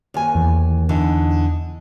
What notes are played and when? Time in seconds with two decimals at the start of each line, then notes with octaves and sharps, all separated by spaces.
0.14 D#2 G#5
0.35 E2
0.89 D3 E3 D#4